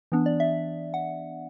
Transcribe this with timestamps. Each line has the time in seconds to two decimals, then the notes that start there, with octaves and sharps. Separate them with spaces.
0.12 E3 B3 D4
0.26 D5
0.40 E5
0.94 F#5